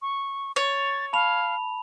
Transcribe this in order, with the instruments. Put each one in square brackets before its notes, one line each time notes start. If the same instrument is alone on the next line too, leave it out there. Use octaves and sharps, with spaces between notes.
[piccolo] C#6
[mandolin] C#5 [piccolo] A6
[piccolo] F5 [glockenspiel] A5 B5 F7